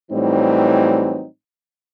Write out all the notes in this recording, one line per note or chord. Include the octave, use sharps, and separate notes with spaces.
A2 E3 F#3 G3 C4 D#4